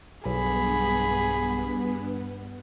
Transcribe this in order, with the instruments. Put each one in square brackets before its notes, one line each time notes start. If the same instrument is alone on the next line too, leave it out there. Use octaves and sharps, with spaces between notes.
[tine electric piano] B1 [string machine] G2 B3 [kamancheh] G#4 B5